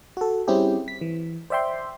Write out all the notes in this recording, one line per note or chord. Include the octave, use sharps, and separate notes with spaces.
F#4 A4
G3 C4 C#4 E4 G4 G#4
B6
E3
C5 D5 E5 G5 C6